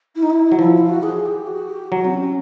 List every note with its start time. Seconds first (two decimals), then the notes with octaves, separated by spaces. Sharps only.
0.15 E4
0.22 D#4
0.30 E4
0.52 F#3
0.59 F3 E4
0.73 E4
0.83 F4
0.89 F#4
1.03 G#4
1.25 G4
1.47 F#4
1.69 G4
1.91 F#3 F#4
2.04 C4
2.13 C#4